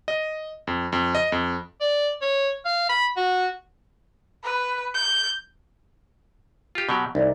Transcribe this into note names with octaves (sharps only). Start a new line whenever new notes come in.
D#5
F2
F2
D#5
F2
D5
C#5
F5
B5
F#4
B4
G6
F4 G4
B2 F#3 G4
C2 D#4 D5